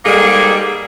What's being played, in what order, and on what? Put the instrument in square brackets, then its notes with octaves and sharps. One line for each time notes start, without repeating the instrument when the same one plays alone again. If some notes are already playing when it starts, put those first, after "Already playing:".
[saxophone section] G#2 G3 A#3 G#4 A4